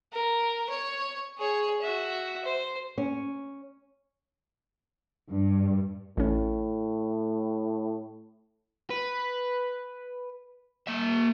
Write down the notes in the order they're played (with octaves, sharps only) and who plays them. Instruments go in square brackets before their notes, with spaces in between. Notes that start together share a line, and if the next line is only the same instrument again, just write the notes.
[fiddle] A#4
C#5
G#4 C#5
F#4 E5
C5
[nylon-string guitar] C#4
[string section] G2
[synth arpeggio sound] A1 C#4 [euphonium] A2
[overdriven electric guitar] B4
A#3 E5